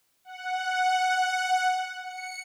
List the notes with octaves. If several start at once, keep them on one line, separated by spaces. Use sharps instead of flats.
F#5
C#7